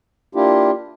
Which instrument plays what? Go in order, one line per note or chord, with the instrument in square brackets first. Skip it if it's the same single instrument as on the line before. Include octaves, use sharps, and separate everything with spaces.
[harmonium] A#3 D4 E4 F4 G4